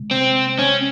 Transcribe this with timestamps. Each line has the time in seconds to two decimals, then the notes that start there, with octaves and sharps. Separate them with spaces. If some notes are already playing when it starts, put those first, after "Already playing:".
Already playing: C3 G#3
0.11 C4
0.59 C#4